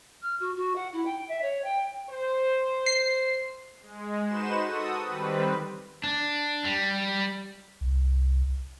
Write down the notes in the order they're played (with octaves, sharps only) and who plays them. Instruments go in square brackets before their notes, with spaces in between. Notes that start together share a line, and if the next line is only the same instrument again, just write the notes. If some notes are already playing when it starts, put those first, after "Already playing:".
[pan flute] F6
F#4
F#4
F#5
E4
G5
E5
C#5
G5
[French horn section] C5
[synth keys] C7
[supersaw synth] G#3
D#4 F#4 B4 C5 E7
F#4 A4 D#6
D#3 G3 C4 B4
[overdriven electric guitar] D4
G3
[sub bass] C2